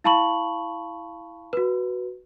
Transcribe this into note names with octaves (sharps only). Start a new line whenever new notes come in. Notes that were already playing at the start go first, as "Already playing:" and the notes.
E4 F5 A5 B5 C#6 F#7
F#4 B4